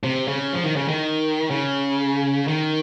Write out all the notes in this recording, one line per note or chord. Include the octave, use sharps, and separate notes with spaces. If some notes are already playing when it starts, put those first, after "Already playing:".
C3
C#3
F3
D#3
C#3
D#3
C#3
D#3